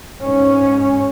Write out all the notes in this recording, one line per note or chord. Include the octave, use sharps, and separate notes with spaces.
G#2 C#4